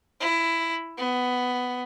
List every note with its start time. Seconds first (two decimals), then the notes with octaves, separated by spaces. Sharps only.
0.21 E4
0.98 B3